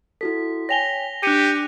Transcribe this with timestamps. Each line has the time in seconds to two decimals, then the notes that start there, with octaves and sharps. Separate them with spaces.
0.21 E4 F#4 A4 B6
0.69 C#5 G5 G#5 A#6 F7 G7
1.23 D4 G4 F#6 C#7 D#7